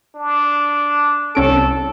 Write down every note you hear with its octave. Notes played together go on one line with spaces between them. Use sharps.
D4
C2 C#4 A4 D7